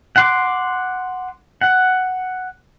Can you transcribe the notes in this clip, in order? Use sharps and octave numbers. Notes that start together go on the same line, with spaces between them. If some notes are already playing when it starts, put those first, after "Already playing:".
F#5 C6 D6
F#5